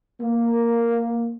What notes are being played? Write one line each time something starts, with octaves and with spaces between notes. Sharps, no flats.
A#3